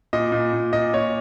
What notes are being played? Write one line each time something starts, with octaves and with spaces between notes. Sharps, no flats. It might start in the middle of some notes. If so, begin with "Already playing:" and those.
A#2 D#5
A#2
A#2
A#2 D#5
A#2 C#5